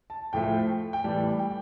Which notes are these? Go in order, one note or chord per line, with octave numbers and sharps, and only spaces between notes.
A5
A2 F3 A3 G5
G5
A2 E3 G3 A5
G5